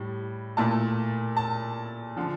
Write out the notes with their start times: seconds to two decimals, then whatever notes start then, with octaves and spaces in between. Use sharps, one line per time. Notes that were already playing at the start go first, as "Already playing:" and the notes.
Already playing: A2 G3
0.57 A#2 A3 E4 A5
1.37 A5
2.17 D3 F3